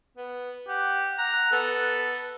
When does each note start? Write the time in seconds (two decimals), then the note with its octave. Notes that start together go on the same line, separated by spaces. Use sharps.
0.17 B3
0.68 G4 F#5
1.18 F#5 A#5
1.52 B3 A4